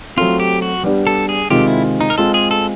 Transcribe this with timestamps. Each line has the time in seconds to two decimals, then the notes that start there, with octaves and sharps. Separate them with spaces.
0.17 F#3 A3 C4 F4
0.40 G4
0.62 F#4
0.83 G3 B3 D4 G4
1.07 A4
1.29 G#4
1.50 C3 D#3 G#3 C4 F4 G4
1.67 E4
2.01 D#4
2.10 A#4
2.18 G#3 C4 F4 A4
2.34 G#4
2.51 A4